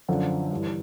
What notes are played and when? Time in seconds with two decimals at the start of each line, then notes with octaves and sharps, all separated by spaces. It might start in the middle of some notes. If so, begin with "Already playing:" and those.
0.09 F#2 D3 F3
0.51 G2 E3